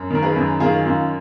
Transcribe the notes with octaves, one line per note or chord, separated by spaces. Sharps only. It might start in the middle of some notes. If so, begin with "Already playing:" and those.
Already playing: F#2
D#3 A#4
G#4 B4
F#2
D#3 F4 G#4
F#2 F4